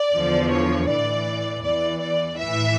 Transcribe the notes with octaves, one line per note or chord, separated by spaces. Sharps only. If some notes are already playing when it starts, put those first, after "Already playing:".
Already playing: D5
E2 D3 F3
C#5
A2 E3 D5
E2 E3 D5
D5
A2 E3 E5